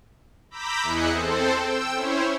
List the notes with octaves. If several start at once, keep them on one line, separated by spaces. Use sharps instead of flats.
A#5 B5 D6 E6 G6 B6
E2 E4 G#4 D#5 F#6 C#7
C4 A4 C5
G5 E6
C#4 E4 C5 C#5